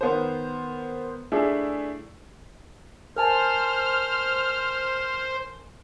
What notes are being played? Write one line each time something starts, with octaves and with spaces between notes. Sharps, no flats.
D#3 B3 C5
A3 D4 E4 G#4
A#4 C5 G#5 A5 F6